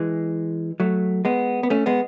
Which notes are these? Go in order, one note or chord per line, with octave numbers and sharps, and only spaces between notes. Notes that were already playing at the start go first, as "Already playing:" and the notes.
Already playing: E3 G#3
F#3 A3
G#3 B3
B3
A3 C#4
G#3 B3